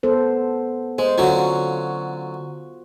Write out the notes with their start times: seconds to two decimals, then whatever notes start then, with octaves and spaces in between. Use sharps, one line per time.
0.03 B3 A4 C5
0.99 G#3 C5
1.18 D3 F#3 C#4 F4 F#4